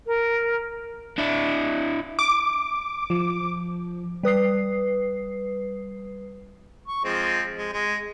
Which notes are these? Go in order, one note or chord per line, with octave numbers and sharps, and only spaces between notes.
A#4
D4 E4
D6
F3
G3 B4 D#6 C7
C#6
F3 G#3 C4
G#3
G#3